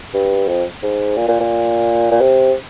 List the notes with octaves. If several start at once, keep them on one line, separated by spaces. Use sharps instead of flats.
G2
F2
G#2
A#2
A#2
A#2
A#2
C3